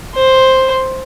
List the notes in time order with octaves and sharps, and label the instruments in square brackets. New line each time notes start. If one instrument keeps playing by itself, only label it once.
[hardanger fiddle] C5